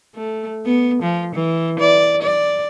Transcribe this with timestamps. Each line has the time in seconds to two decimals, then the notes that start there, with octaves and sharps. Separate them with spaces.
0.15 A3
0.66 B3
1.03 F3
1.35 E3
1.80 D5
2.22 D5